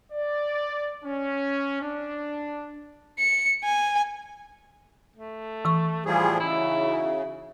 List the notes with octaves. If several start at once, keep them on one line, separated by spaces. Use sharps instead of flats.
D5
C#4
D4
C#7
G#5
A3
E3 C#6
A2 F3 G3 F#4 G#4 G#5
C#3 D#4 E4 F#4 E5